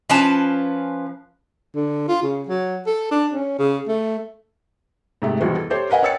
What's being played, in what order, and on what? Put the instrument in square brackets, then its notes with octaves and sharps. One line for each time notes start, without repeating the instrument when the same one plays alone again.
[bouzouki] F3 C#4 B4 A5
[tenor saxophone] D3
F4
C#3
F#3
A4
D4
C#4
C#3
A3
[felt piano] G#2 C3 A3
B1 E2 G3 F#4 C5
A4
G4 A4 C5 C#5
A#4 B4 D#5 F#5 G#5
C#5 G5 E6 A6 C#7